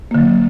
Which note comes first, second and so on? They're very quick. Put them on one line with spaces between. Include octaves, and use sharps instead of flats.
A#3 D3 F#3